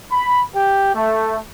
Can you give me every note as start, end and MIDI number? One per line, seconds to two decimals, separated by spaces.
0.12 0.42 83
0.55 0.91 67
0.95 1.39 57